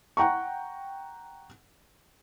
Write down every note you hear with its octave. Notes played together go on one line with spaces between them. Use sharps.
F#5 G5 A#5 C#6